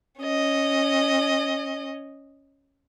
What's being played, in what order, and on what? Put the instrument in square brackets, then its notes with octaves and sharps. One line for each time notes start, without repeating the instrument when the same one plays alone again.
[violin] C#4 D#5